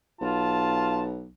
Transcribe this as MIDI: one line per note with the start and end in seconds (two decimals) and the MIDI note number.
0.21 1.29 35
0.21 1.02 65
0.21 1.05 81